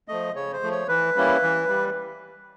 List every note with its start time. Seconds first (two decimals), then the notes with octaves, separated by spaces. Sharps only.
0.08 F3 A3 D#5
0.35 C#3 C#5
0.53 C5
0.63 F3 A3
0.71 C#5
0.88 E3 B4
1.16 G3 A#3 C#4 E4
1.43 E3
1.69 G3